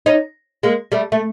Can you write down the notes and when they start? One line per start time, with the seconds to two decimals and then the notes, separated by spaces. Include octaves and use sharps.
0.06 C#4 D#4
0.63 G#3 A#3
0.92 G3 A3
1.12 A3